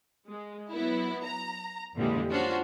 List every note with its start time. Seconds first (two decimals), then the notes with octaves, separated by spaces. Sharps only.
0.27 G#3
0.71 F#3 B3 E4
1.25 A#5
1.94 F2 A#2 D3 E3 G3 G#3
2.31 C#4 D4 F4 F#4 C5